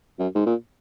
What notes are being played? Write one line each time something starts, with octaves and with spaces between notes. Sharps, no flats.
F#2
G#2
A#2